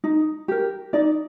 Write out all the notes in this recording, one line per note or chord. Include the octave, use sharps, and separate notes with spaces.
D#4
G4 A#4
D#4 D5